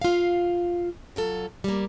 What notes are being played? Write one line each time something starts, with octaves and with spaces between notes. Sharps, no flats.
F4 F5
F#3 F4 A4
G3 A#3